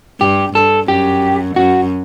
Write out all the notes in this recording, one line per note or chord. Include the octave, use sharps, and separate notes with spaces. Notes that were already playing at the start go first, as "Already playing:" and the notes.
G2 G4
G2 A4
F#2 G4
F#2 F#4